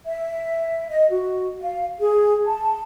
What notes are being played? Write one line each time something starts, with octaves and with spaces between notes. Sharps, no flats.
E5
D#5
F#4
F5
G#4
A5